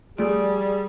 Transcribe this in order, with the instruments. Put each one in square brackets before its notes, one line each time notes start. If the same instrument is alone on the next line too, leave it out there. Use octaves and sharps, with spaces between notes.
[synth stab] F3 A3 [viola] G3 [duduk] G#4 [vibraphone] D5